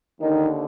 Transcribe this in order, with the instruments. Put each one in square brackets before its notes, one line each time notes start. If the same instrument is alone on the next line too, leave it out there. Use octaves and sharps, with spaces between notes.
[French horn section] D#2 D3 D#3 D#4